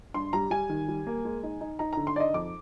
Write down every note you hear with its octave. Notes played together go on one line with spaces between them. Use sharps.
G2 C6
G3 A#5
G3 G#5
D#3
G3
A#3
G#3
D#4
D#4
D#4 A#5
D3 A#5
C6
D#4 D5 D#5
F2 D6